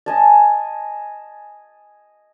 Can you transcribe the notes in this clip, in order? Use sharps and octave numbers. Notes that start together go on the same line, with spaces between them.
D#5 G#5 A5